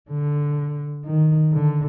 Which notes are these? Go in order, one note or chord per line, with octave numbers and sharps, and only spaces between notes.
D3
D#3
D3